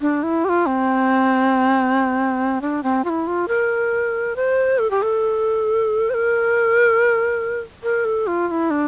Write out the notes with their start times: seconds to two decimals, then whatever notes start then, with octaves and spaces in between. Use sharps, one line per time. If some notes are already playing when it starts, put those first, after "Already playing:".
0.01 D4
0.23 E4
0.45 G4
0.49 F4
0.66 C4
2.61 D4
2.83 C4
3.05 F4
3.09 E4
3.27 F4
3.48 A#4
4.36 C5
4.79 A4
4.91 G4
5.02 A4
6.10 C5
6.14 A#4
7.83 A#4
8.05 A4
8.27 F4
8.48 F4
8.51 E4
8.70 D4